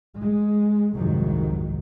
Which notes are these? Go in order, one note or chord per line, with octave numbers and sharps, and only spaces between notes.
G#3
C2 F2 G#2 D#3 F#3